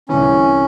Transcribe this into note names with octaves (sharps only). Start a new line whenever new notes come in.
C2 C3 E3 C#4